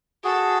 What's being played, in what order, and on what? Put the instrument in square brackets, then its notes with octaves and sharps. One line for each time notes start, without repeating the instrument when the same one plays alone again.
[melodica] F#4 G#4 [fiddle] A4